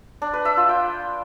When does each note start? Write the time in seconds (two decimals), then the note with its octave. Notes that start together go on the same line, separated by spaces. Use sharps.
0.22 D4
0.33 B4
0.45 E5
0.57 F4
0.69 G5